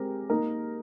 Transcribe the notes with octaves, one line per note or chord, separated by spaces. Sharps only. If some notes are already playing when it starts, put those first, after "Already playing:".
Already playing: G#3 C4 G4 A#4
A#3 D#4 A#4